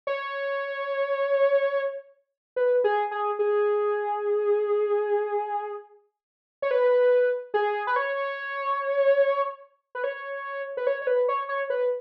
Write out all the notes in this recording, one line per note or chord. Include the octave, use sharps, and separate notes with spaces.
C#5
B4
G#4
G#4
G#4
C#5
B4
G#4
B4
C#5
B4
C#5
B4
C#5
C#5
B4
C#5
C#5
B4